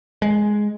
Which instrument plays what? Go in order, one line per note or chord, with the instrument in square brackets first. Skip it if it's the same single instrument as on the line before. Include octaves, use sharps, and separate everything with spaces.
[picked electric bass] G#3